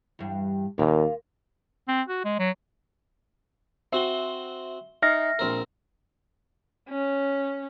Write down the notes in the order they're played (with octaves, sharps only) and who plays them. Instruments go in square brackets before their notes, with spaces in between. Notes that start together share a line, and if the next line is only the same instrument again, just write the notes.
[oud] E2 G2
[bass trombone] D#2 [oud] A#2 A#3
[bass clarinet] C4
F#4
G#3
F#3
[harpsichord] C4 F#4 [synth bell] E5 G7
[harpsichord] D#4 [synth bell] E5 F6 A#6
[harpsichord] A#1 C4 A#4
[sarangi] C#4